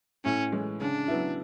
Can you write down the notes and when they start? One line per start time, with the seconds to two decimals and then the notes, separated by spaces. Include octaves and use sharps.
0.24 A2 C#4
0.52 E3 G#3 C#4
0.81 C#3 D4
1.08 F#3 B3 E4